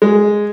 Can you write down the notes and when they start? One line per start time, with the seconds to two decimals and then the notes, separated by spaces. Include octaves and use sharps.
0.02 G#3